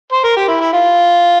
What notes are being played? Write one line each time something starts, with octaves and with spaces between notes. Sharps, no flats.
C5
A#4
G4
E4
E4
F4